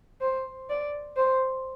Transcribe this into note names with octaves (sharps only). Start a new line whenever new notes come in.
C5
D5
C5